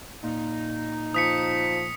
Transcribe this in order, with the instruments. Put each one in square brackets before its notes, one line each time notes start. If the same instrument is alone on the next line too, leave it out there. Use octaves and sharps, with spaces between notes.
[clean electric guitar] A#2 [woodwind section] D#4
[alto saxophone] F3 [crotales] D#6 B6 C#7